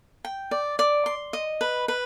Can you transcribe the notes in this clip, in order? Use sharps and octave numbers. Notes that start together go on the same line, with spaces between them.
G5
D5
D5
C6
D#5
B4
B4